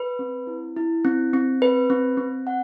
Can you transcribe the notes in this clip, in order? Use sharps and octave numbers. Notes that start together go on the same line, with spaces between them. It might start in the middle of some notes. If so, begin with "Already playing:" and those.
Already playing: B4
C4
E4
E4
C4
C4
B4
C4
C4
F#5